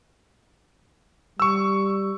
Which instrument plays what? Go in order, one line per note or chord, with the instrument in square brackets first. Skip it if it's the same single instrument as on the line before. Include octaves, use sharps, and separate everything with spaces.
[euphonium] G3 [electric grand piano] C#6 E6